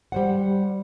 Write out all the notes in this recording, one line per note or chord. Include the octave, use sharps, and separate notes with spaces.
G3 C5 F#5